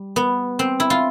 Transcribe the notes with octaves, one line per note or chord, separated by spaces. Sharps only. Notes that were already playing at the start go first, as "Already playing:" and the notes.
Already playing: G3
B3
C4
E4
F4